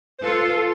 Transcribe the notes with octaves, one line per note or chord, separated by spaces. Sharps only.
C5
F4 A4 B4
A4